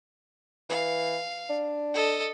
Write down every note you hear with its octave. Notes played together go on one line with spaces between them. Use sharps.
E3 F5
D4
A4 D#5